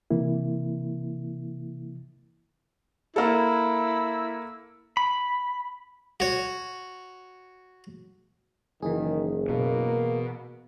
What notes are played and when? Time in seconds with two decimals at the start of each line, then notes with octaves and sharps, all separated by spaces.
0.11 C3 E3 A#3 E4
3.16 A#3 E4 A4
4.97 B5
6.20 F#4 C#5
8.82 F#1 D#3 E3 G#4
9.49 B2 A#3